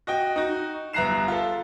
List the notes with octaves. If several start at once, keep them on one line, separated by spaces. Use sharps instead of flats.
F#4 D#5 G5
D#4 F#4
G1 E5 A#5 F#6 C7 E7
F4 A4